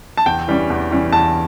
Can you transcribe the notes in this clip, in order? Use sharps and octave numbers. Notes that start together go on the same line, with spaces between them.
A5
E2 G5
E3 G3 C#4
E2
E3 G3 C#4
E2 A5